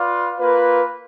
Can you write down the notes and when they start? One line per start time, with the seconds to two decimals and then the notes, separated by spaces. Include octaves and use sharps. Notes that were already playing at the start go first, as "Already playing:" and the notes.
Already playing: F4 B4 D5 F5
0.40 A#3 F4 B4